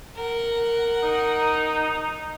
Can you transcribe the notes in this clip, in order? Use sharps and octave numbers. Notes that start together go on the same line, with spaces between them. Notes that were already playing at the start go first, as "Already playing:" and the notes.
A#4 F#5
D#4